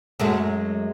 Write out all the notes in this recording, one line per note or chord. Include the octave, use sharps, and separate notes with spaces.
F#2 G#3 A3